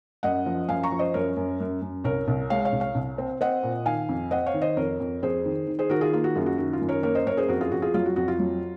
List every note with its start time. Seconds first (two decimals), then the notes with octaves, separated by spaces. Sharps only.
0.23 F#2 D#5 F#5
0.46 F3
0.68 F#2 F5 G#5
0.83 A#5 C#6
0.92 F3
0.99 C5 D#5
1.14 F#2 A#4 C#5
1.37 F#2
1.60 F#2
1.82 F#2
2.04 C2 A#4 C#5
2.28 C2
2.50 G#3 C#5 F5
2.65 C#5 F5
2.72 C2
2.80 C#5 F5
2.95 C2
3.18 C4
3.41 C4 D#5 F#5
3.63 A#2
3.86 D#3 F5 G#5
4.09 F2
4.31 C4 D#5 F#5
4.46 C#5 F5
4.54 D#3
4.62 C5 D#5
4.77 F2 A#4 C#5
5.00 F2
5.23 F2 G#4 C5
5.45 D#3
5.67 D#3
5.79 G#4 C5
5.90 D#3 F#4 A#4
6.01 F4 G#4
6.13 A#3 F4
6.24 F#4
6.35 F#2 F4 G#4
6.46 F#4
6.58 D#3 F#4
6.73 F4
6.81 F#2
6.89 A#4 C#5
7.03 A#3 A#4 C#5
7.15 C5 D#5
7.26 F#2 A#4 C#5
7.37 G#4 C5
7.48 F2 F#4 A#4
7.61 F4 G#4
7.72 F2 F#4
7.82 F4 G#4
7.94 F#3 F4
8.06 F#4
8.16 F2 F#4
8.28 F4
8.39 F#3